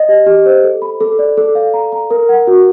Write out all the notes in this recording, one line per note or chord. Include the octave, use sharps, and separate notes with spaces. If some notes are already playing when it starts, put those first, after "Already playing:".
Already playing: D#5
G4
G4
C5
A4
B5
A4
D5
A4
F5
A#5
A#5
A#4
F#5
F#4